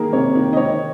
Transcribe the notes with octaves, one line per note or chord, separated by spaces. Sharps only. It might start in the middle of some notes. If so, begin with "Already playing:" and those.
Already playing: D#3 A#3 G#4 A#4
C3 C#5
D#3 A#3
D#5
D#3 C#5